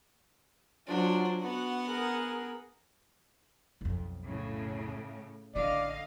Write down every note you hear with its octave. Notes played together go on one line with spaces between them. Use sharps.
F#3 D4 F4 C5
B3 F#4 F#5
G#4 A#4
B1 F2
A2 C#3
A1 D3 D4 D5 D#5 F5